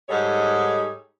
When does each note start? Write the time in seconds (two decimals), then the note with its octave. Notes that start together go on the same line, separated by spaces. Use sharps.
0.09 G#2 G3 D#4 G#4 A4 C#5